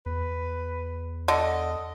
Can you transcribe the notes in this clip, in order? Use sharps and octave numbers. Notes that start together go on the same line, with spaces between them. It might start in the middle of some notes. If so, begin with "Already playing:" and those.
E2 B4
D3 D#5